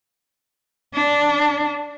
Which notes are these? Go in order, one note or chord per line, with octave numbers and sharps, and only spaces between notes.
D4